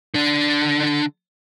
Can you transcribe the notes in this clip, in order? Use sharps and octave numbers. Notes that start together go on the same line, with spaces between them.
D3 D4